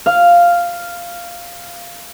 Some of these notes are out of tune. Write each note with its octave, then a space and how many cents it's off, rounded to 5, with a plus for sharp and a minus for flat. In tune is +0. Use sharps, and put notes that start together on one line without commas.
F5 -5